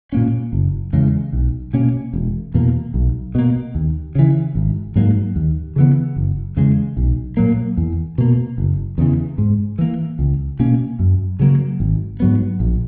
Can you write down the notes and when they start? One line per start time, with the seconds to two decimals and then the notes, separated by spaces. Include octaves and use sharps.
0.12 A#2 A#3 C#4
0.53 F#1
0.93 E2 C#3 G#3
1.33 B1
1.73 B2 A#3 C#4
2.13 E1
2.54 E2 B2 A#3
2.94 B1
3.35 B2 A#3
3.75 D#2
4.15 C#3 E3
4.55 G#1
4.95 G#2 F#3 A#3
5.36 D#2
5.76 C#3 E3 B3
6.16 F#1
6.56 E2 C#3 G#3
6.97 B1
7.37 A#2 F#3 A#3
7.77 E2
8.18 B2 A#3
8.58 F#1
8.98 E2 C#3 E3
9.38 G#2
9.78 E3 A#3
10.19 C#2
10.59 B2 A#3 C#4
10.99 F#2
11.39 C#3 F#3 A#3
11.80 G#1
12.20 G#2 F#3 B3
12.60 A#1